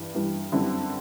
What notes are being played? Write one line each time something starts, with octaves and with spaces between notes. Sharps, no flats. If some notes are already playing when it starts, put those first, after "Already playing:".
Already playing: G2 E3 G3
G2 E3 G3
F#2 D3 G3 C4 E4